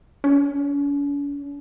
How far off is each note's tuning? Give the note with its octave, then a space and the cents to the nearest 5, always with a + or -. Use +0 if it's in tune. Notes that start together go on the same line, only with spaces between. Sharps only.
C#4 +45